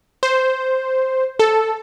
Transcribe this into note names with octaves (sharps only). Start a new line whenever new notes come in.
C5
A4